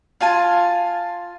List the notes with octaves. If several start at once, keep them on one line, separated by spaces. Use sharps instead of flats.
F4 F5 G#5 A5